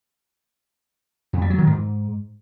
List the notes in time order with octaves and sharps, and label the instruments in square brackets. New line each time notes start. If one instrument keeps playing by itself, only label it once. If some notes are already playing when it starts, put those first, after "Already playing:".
[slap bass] F2
G3
F#3
D#3
G#2